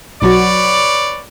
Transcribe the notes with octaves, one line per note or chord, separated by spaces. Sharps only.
B1 F#3 F#4 B4 C#5 D5